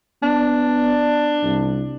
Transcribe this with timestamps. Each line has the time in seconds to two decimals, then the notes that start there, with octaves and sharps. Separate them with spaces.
0.23 B3 D4
1.43 C2